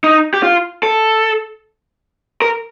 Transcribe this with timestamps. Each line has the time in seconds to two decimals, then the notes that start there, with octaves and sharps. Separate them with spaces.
0.04 D#4
0.34 G4
0.43 F4
0.83 A4
2.42 A#4